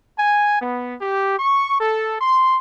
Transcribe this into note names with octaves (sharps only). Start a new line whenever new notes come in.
G#5
B3
G4
C#6
A4
C6